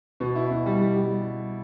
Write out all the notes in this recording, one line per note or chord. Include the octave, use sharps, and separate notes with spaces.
B2
E4
B2
G3
G3
G3